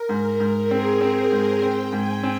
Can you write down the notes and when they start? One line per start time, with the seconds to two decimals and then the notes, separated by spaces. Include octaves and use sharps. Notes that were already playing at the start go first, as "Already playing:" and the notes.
Already playing: A#4
0.09 G#2
0.24 A#4
0.40 G#2
0.70 C4 G#4
1.01 C4 C5
1.31 G#2 C5
1.62 C4 G5
1.93 G#2 G#5
2.23 C4